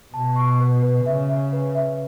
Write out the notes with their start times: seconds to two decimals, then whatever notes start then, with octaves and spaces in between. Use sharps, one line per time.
0.14 B2 A5
0.36 C#6
0.60 B4
0.82 B4
1.05 C#3 E5
1.29 E5
1.52 B4
1.75 E5